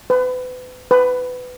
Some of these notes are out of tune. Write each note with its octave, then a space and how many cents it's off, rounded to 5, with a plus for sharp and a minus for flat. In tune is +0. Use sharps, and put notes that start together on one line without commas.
B4 +35
B4 +20